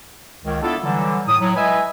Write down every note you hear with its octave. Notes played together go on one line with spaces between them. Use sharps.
C#2 D#3
B3 D4 E4 F4 A4
D3 E3 F#3 G3
A2 D#6
A2 F#3
G#3 B4 D#5 E5 G#5